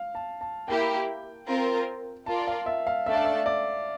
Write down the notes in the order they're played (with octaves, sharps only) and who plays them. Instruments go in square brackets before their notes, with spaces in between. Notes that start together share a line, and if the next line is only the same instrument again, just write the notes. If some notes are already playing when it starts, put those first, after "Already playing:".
Already playing: [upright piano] F5
A5
A5
[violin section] A#3 E4 G4 [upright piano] G5
[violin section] C4 F4 A#4
[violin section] F4 A#4 D5 [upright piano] A5
[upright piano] F5
E5
F5
[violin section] A3 D4 A4 D5 A5 [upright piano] E5
[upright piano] F5
E5
D5